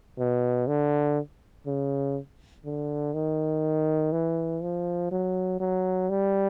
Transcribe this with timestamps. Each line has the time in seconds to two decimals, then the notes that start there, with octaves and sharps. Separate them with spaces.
0.19 B2
0.67 D3
1.67 C#3
2.65 D3
3.14 D#3
4.12 E3
4.62 F3
5.11 F#3
5.60 F#3
6.10 G3